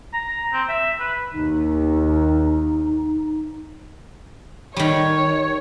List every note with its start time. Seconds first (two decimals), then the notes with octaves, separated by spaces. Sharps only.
0.14 A#5
0.53 C4
0.69 E5
1.00 B4
1.33 D#2 D#4
4.77 D#3 G3 C#5